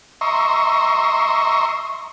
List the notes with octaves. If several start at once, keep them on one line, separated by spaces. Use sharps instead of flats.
D#5 E5 A#5 C6 C#6